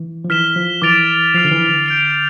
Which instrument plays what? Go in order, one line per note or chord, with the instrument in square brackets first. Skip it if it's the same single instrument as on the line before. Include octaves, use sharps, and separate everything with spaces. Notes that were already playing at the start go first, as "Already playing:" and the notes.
Already playing: [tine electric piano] E3
F3
[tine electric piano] E3 [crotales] F6 B6 E7 G7
[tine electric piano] F3
[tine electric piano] E3 [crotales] D6 A6 D7 F7
[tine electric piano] F3 [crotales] F6 C7 F7
[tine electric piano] D3
E3
D3
[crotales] G6 D7 F7